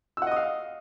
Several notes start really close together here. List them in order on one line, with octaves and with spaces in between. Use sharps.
E6 F#5 D#5 D#6 F5